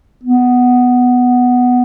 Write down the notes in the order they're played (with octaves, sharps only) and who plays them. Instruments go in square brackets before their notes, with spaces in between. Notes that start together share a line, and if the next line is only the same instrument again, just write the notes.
[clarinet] B3